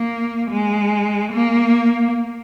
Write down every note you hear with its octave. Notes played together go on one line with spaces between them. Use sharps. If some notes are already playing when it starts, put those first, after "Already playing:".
Already playing: A#3
G#3
A#3